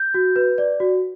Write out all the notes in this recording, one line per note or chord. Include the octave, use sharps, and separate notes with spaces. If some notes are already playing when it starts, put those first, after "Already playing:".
Already playing: G6
F#4
B4
D5
F#4